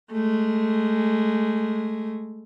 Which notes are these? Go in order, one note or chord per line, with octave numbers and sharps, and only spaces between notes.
G#3 A3